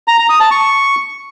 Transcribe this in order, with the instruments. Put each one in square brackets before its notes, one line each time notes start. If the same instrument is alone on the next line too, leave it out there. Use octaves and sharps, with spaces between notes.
[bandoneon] A#5
A#5
D#6
A5
C#6